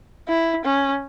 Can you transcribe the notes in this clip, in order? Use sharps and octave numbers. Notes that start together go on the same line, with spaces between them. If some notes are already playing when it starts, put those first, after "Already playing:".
E4
C#4